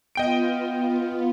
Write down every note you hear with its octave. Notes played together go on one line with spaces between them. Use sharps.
B3 F4 D#5 G5 D7